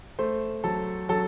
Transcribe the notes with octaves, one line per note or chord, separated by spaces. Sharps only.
A3 C5
F#3 A4
F#3 A4